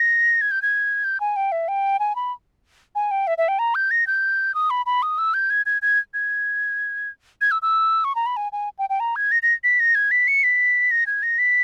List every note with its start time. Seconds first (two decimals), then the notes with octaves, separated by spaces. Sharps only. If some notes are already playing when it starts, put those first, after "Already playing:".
Already playing: A#6
0.41 G#6
0.51 G6
0.62 G#6
1.04 G6
1.20 G#5
1.36 G5
1.52 E5
1.68 G5
2.00 G#5
2.16 B5
2.95 G#5
3.11 G5
3.27 E5
3.38 E5
3.48 G5
3.59 A#5
3.75 G6
3.91 A#6
4.07 G6
4.55 D#6
4.70 B5
4.86 B5
5.02 D#6
5.18 E6
5.34 G6
5.50 G#6
5.66 G#6
5.82 G#6
6.14 G#6
7.41 G#6
7.51 E6
7.62 E6
8.05 C#6
8.15 A#5
8.26 B5
8.37 G#5
8.52 G#5
8.79 G5
8.90 G5
9.00 A#5
9.16 G#6
9.32 A#6
9.43 A#6
9.64 B6
9.80 A#6
9.95 G#6
10.11 B6
10.28 C#7
10.44 B6
10.91 A#6
11.07 G#6
11.23 A#6
11.39 B6